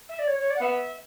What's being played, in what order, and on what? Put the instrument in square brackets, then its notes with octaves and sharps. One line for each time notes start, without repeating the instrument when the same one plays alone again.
[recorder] E5
D5
C#5
C#5
D5
F#5
[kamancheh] B3 [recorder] E5